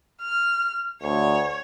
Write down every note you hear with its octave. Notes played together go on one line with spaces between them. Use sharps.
F6
D2 C#5